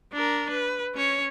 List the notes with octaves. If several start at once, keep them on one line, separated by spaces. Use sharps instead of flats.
D4 A#4
B4
C#4 C#5